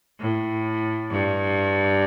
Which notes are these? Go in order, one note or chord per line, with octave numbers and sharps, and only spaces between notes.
A2
G2